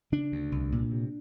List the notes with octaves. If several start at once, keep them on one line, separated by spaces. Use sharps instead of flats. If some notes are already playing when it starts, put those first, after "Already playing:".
C#3 D4
D2
C2
A#2
C3